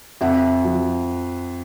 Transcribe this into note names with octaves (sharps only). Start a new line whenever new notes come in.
F2 E5 F#5
F3